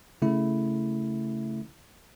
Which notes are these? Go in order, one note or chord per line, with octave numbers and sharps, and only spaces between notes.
C#3 A3 E4